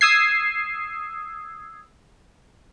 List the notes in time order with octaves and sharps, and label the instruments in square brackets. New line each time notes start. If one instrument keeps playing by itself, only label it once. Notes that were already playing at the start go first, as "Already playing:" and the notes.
[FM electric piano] D#6 E6 G#6 C7